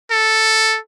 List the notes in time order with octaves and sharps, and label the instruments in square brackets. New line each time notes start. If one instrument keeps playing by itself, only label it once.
[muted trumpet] A4